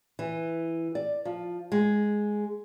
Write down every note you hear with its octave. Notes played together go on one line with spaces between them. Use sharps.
E3
D5
F3
G#3